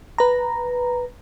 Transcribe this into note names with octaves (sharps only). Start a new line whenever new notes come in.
B4 A#5